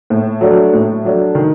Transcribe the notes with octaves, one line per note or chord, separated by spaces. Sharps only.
A2
F#3 A3 D4
A2
F#3 A3 D4
D#3